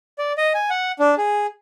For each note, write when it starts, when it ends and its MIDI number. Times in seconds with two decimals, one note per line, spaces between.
0.18 0.33 74
0.38 0.53 75
0.54 0.70 80
0.70 0.92 78
0.99 1.15 62
1.17 1.47 68